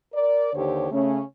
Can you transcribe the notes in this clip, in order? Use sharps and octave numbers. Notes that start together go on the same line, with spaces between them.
A#4 D5
D#2 D3 G4 C5 C#5
C#3 A3 C#4